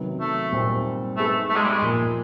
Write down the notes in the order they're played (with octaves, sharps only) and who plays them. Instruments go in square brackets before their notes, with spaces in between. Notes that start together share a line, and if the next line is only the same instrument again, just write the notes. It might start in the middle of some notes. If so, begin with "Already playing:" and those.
Already playing: [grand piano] C3 D#3 F#3 B3
[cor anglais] A3
[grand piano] A#2 G3 C4 D#4
[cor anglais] A3 [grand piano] B3 D#4 G#4 B4
[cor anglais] A3
G#3
G3
G#3
[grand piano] A#2 F3 A#3